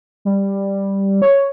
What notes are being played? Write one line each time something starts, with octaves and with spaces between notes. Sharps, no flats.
G3
C#5